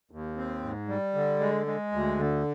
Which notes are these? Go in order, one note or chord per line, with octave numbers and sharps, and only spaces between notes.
D#2
C4
G#2
G3
D3
G#3
G#3
D2
D3